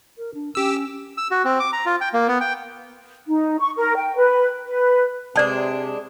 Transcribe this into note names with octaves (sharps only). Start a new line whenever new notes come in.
A#4
D4
C#4 G4 E6
E6
F#4
C4
D6
A#5
F4
G5
A#3
B3
G5
D#4
C#6
A#4
G5
B4
B4
C3 G#3 D4 C5 D5 A5